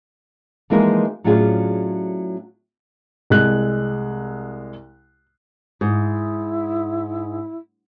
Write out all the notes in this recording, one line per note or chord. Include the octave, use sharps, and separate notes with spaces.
E3 F3 G#3 A#3 D#4 A#4
A2 F#3 C#4 D4 F4 G#4
C2 G#3 F#6
G#2 E4